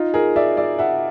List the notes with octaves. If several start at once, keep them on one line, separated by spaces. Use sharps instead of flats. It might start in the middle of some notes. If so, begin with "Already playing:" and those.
Already playing: D#4 F4
G#4 A#4
D5 E5
D5 E5
E5 F#5